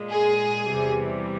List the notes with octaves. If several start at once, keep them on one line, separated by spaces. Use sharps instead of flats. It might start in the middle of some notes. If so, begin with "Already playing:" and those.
Already playing: A#2 G#3
G#4
E2 C3 E3 G3